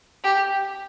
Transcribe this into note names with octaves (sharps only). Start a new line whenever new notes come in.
G4